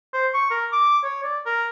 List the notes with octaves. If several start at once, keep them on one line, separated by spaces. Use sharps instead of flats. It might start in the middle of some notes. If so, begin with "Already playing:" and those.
C5
C#6
A#4
D6
C#5
D5
A#4